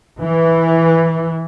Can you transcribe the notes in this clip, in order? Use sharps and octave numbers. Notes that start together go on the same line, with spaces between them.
E3